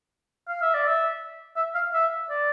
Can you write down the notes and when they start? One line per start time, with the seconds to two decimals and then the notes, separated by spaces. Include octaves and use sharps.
0.48 F5
0.62 E5
0.74 D5
0.87 E5
1.56 E5
1.75 F5
1.93 E5
2.30 D5